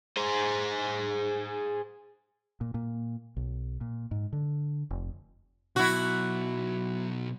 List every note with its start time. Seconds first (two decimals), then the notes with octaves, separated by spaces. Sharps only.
0.17 G#4 C5
2.61 A#2
2.74 A#2
3.37 B1
3.81 A#2
4.11 G#2
4.33 D3
4.91 F1
5.76 B2 F#3 E4 F#4